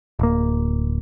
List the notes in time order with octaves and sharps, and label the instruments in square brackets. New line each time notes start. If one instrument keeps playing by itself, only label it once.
[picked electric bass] D1 A#3